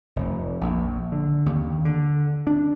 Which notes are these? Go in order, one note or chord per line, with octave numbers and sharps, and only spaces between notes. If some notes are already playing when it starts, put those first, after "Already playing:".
F1
A#1
D3
D#2
D3
D4